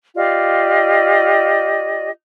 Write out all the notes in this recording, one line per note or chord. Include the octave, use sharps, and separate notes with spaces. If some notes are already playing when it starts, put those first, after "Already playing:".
F4 G4 D5 D#5